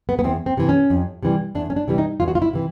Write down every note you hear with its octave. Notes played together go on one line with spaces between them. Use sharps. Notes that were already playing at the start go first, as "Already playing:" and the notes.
B3
B3
E2 C4
C4
C3 E3
C#4
F2
C3 E3 G3
E2 D4
C#4
D4
C3 E3 G3
D#4
E2 F4
F#4
F4
E4
C3 E3